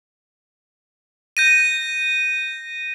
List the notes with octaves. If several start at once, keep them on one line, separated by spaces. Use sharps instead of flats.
G6 A#6 D#7